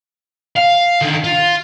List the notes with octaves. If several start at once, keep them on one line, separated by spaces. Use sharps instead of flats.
F5
D3 D#3
F4